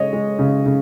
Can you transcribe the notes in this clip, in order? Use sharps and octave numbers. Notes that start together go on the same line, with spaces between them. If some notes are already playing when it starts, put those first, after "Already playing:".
Already playing: C#3 G#3 C#5 D#5
G#3
C#3
C#3